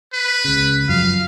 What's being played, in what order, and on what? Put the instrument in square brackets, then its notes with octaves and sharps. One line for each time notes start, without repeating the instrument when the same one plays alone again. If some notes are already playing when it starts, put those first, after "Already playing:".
[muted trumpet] B4
[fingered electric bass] C#2 C#3
[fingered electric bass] F#2 F3 [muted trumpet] F5